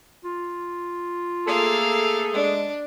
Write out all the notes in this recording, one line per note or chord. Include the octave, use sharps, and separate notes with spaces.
F4
A3 A#3 G#4 A4 F5
G#3 D4